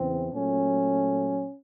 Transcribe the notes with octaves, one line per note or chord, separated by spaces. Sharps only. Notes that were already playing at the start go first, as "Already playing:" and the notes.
Already playing: E2 C#3 E3 C4
A#2 F#3 A3 C#4